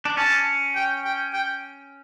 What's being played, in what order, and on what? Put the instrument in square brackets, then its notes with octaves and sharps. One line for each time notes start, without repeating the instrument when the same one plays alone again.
[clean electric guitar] D4
[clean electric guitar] C#4 [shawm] A5
[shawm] G5
G5
G5